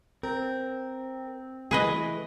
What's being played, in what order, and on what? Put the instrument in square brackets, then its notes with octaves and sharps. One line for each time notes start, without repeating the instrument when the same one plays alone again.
[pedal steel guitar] C4 [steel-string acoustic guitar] A#4
[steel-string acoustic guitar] E3 A3 [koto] G#4 B4 D#5